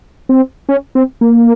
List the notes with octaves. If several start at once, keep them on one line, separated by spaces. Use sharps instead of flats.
C4
C#4
C4
A#3